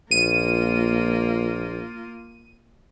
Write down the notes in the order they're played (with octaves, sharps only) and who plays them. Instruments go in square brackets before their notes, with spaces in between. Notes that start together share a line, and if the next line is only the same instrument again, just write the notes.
[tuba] A#1 [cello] A#3 F4 [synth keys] D#7